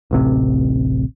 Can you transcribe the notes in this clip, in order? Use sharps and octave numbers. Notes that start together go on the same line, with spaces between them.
D1 A1 C3